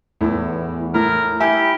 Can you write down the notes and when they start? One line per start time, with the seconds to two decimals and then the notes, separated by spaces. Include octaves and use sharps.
0.21 E2 A2 E3
0.94 A2 A#4
1.40 E4 G4 G#5